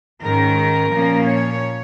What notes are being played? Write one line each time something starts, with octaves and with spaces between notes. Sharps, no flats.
G#2 D#3 C#4 A#4
A#2 F3 A#3 C#4
C#5